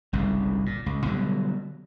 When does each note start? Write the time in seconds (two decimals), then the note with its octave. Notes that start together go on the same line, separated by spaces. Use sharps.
0.13 G1 C2 G#2 C#3
0.66 A#2
0.86 C#2
1.06 B2 D3 F#3 G3